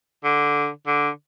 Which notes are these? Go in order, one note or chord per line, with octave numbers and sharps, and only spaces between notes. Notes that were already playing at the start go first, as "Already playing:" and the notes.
D3
D3